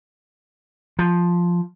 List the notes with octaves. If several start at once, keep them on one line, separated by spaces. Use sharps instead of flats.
F3